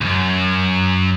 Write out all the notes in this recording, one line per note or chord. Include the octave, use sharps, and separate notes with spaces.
C#2 F#2